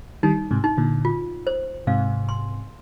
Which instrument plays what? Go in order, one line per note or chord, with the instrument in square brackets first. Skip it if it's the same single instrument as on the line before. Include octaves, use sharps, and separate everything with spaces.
[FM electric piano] D#3 G3 [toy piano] D#4
[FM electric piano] G#2 C3
[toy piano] D#4
[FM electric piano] A#2 D3
[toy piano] F4
C5
[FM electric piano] G#2 C3 [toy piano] F5
[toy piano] C6